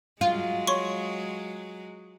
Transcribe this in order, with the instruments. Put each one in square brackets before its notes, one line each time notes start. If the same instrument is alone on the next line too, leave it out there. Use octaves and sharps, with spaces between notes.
[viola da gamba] F#3 G#3 [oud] F4
[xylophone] C#5 C6 C#6